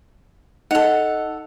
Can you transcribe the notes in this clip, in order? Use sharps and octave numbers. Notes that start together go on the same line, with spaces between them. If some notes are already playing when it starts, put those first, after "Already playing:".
D#4 A4 D#5 F#5 F7